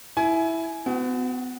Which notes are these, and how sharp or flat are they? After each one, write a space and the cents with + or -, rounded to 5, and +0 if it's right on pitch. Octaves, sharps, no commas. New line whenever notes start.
E4 +0 G#5 +20
B3 +40 F#4 -10